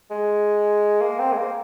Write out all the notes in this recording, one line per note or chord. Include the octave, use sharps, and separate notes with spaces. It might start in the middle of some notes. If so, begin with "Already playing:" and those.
G#3
A#3
C4
G#3
A#3